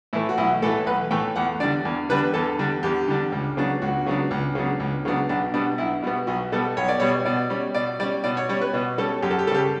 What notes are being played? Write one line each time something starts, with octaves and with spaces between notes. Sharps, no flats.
A2 E3 A3 E4
F#4
B1 E4
A2 E3 A3 A4
B1 B4
A2 E3 A3 G5
E2 F#5
D3 G3 D4 D5
E2
D3 G3 D4 B4
E2 A4
D3 G3 D4
E2 G4
D3 G3 D4
C#2
C#3 F#3 B3 D4
C#2 F#4
C#3 F#3 B3 D4
C#2
C#3 F#3 B3 D4
C#2
C#3 F#3 B3 D4
B1 D4
B2 G3 B3 D4
B1 E4
B2 G3 B3 F#4
B1 F#4
B2 G3 B3 A4
B1 C#5
D5
B2 G3 B3 C#5
B2 D5
G3 C#4
B2 D5
G3 C#4 D5
B2 D5
C#5
G3 C#4 C#5
B4
B2
G3 C#4 A4
F#2 G4
A4
G4
C#3 G3 G4 A4